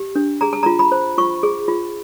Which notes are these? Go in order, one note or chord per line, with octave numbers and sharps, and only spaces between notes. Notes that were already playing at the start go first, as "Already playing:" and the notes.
Already playing: G4
D4
G#4 A#5
A5
F4 A#5
B5
C5
F4 C#6
G#4
F4